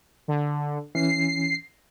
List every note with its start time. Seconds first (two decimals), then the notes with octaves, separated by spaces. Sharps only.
0.28 D3
0.95 E3 C#4 C7